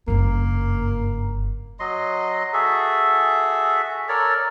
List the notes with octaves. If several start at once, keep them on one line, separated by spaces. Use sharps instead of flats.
F#1 G2 A#3
F#3 D#5 C6
F#4 G#4 A4 E5
A4 A#4 C#5 D5